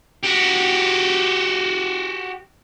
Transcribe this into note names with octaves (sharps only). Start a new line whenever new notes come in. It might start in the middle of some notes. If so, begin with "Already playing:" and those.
F#4 G4